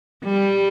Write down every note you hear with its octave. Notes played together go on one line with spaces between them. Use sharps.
G3